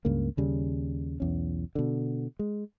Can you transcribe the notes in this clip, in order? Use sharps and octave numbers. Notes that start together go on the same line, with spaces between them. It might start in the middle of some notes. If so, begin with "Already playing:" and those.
C#2 G2 C#3 A#3
D#2 C#3 G3
B1 E2 C#4
B2 D3
G#3